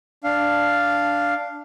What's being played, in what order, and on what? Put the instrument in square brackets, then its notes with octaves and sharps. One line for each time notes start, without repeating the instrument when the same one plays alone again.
[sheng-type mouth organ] D4 F5